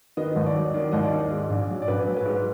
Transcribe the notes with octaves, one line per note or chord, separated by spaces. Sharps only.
D#3 B4 D#5
D#2
D5
F#3
D#3 D5
D#2 D#5
D5
D#3
G#2
A#1
F#3
D5
A#1 B4
F#3
B4
G#2